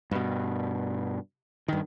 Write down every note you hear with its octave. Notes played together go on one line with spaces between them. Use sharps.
G2 B2
G2 D#3